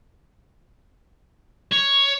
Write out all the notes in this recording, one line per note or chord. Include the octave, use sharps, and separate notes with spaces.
C#5